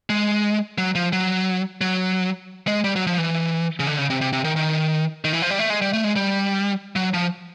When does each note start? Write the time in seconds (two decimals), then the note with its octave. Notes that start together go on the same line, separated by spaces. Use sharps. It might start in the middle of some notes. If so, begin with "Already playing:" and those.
0.10 G#3
0.78 F#3
0.95 F3
1.13 F#3
1.81 F#3
2.68 G#3
2.84 G3
2.96 F#3
3.07 F3
3.18 E3
3.80 C#3
3.87 D3
3.98 C#3
4.10 C3
4.21 C3
4.33 C3
4.45 D#3
4.56 D#3
5.24 D#3
5.33 E3
5.42 F3
5.50 G3
5.59 A3
5.70 G#3
5.82 G3
5.93 A3
6.04 G#3
6.16 G3
6.96 F#3
7.14 F3